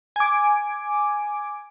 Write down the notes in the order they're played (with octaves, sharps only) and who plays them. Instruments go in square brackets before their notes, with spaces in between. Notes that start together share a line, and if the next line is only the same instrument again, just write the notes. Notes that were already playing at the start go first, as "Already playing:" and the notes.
[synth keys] G#5 D6